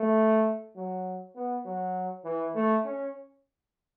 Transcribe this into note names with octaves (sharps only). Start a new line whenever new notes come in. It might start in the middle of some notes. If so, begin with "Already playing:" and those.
Already playing: A3
F#3
B3
F#3
E3
A3
C#4